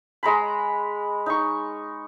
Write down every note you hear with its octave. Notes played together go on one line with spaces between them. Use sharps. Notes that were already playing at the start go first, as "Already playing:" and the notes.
G#3 A#5 B5
D#4 C#6